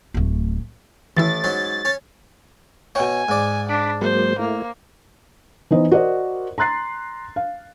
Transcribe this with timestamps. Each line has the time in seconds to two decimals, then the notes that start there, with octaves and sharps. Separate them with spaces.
0.14 D1 A3
1.17 A1 A2 D#3 E3 E4 A6
1.44 G#2 F#3 C#4
1.85 C#4 C#5
2.95 B2 C#5 G#5
3.29 G#2 D5
3.69 D4 B5 D6
4.01 F#3 G#3 A#3 C5
4.39 A3 A#3 E4
5.71 E3 B3 D#4 C5 D#5
5.92 F#4 A#4 C5 D5 D#5
6.58 A#5 C6 F#6 A6 C7
7.36 F5